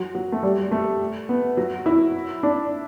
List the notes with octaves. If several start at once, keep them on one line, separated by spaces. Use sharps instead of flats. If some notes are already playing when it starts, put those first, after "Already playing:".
Already playing: F#3
F#3
A3
G3
A3
B3
F#3
E4
D4